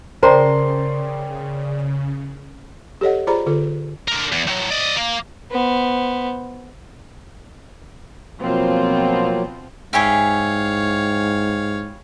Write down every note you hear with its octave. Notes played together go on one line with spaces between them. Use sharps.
C#3 A#4 C5 D5 G5 A5 A#5 C6
G4 A4 C#5 D#5 F#5
F4 G#4 C5 D5 A#5 B5
D3 F4 A4
D3 A#4
E2
A2 F#3
D5 D#5
A#3
B3 C5
B2 F3 F#3 A#3 C4 F4
G#2 E4 G4 G#4 C#5 F5